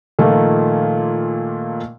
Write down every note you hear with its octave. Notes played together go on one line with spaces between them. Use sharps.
A#2 D#3 F3 A3 A#3